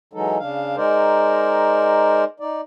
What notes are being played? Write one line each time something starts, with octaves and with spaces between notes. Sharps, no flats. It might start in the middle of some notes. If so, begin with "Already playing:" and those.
E3 F#3 G#3 D#4 A4
C#3 D4 F5
G#3 D#4 A#4 C5 D5
D#4 D5